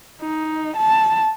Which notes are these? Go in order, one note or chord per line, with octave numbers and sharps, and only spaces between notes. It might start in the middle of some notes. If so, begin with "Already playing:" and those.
D#4
A5